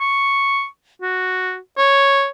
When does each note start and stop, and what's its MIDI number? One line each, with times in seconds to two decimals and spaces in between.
0.01 0.66 85
1.02 1.58 66
1.78 2.28 73